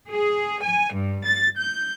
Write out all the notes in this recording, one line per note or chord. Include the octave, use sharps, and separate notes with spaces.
G#4
G#5
G2
A6
G6